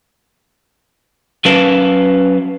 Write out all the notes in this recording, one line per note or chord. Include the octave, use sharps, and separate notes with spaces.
F#3 C#4 A#4 B4 F5 A5